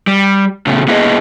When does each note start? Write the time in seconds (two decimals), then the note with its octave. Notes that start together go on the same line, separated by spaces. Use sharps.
0.07 G3
0.67 A#2 C#3 A3 B3 C#4
0.88 A#3 B3 E4 G#4 B4 D#5